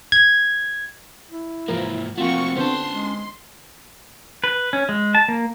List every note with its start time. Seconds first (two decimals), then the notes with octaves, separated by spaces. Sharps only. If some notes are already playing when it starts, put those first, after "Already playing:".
0.12 G#6
1.30 E4
1.68 G#2 E3 F3 A#3 A#4
2.18 F3 A3 A#3 C4 F4 F#4 C#6
2.57 D3 B3 C#4 C5 A5 C6
2.91 G#3
4.44 B4
4.73 C#4
4.89 G#3
5.15 A5
5.28 A#3